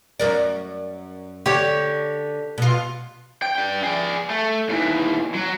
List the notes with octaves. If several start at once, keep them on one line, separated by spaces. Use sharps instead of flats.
F#2 A#4 D5
D3 G4 C#5
B2 F4
G5
D4 G5
G#4 D5
A3
D#2 E3
F#3